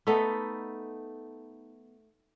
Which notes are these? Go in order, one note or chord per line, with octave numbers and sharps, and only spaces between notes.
A3 B3 D#4 A4